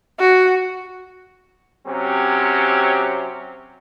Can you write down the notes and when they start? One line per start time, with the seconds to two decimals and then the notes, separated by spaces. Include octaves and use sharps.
0.19 F#4
1.87 C3 F#3 C4 C#4 G4